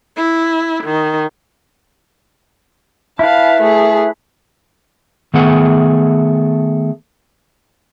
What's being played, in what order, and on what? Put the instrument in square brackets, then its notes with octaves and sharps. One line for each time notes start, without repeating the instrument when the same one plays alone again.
[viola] E4
D#3
[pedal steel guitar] E4 B4 [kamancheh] F5 A5
[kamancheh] A3 G#4
[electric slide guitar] D#3 A3 B3 G#4 F#5